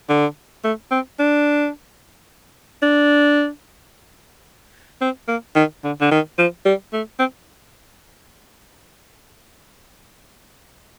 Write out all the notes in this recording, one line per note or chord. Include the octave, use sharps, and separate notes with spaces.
D3
A3
C4
D4
D4
C4
A#3
D#3
D3
D3
D#3
F3
G3
A3
C4